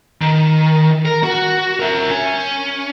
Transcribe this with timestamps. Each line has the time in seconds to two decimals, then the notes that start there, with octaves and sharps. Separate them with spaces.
0.22 D#3
1.05 A#4
1.23 F#4
1.80 A#4 E5
2.10 C#4